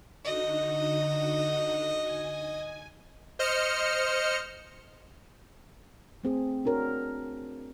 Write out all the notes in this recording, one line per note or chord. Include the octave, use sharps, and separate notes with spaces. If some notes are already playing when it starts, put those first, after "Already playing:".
D3 D#4 F#4 D#5
G#5
C5 D#5 F6 C#7
A3 C4 G#4
D4 F#4 A#4 C#5